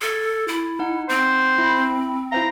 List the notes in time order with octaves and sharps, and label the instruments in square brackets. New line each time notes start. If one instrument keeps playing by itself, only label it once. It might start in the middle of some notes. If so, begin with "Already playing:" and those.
[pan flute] A4 [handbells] G#6 A6
[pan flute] E4
[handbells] D#4 F#5
[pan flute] C4 [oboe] C5
[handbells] E4 B5
[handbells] E4 C5 F5 [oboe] A#5